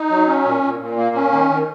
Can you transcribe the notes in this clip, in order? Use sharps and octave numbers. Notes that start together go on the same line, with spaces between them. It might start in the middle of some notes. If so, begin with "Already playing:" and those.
Already playing: D#4
F#3
C#4
A#2
A#2
A#2
A#3
C#4
D#3
D#3